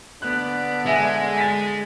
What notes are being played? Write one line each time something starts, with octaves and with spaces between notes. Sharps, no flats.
D3 B3 D5 F#6
G#3 E5 G#5
A6 B6